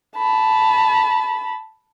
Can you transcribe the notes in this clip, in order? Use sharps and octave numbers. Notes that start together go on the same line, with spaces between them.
A5 B5